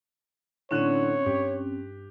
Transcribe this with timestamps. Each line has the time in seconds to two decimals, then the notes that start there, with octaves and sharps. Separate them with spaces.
0.71 A2 D3 C4 C#4 C#5 F#6
1.26 G2 G4